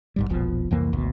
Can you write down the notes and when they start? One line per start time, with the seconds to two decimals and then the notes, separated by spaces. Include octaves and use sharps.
0.16 A#1 G#2 G3
0.29 E1 A#1 B2 F3
0.71 C2 F2 E3 A#3
0.92 G#1 D2 B2